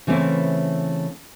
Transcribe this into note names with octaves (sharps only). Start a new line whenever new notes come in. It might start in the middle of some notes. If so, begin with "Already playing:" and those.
C#3 E3 A3 C4 C#4 E4